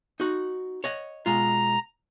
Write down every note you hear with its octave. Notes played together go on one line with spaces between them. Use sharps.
D#4 F#4
C#5 D#5 F#5
B2 G#3 F4 A#5